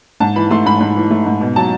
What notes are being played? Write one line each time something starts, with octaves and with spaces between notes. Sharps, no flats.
G#2 A5
E3 B5
A3 C6
G#2 B5
G#2
E3
A3
G#2
B2
F#3 A5